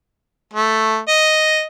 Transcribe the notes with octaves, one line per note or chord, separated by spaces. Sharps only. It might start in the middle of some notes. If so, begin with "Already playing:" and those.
A3
D#5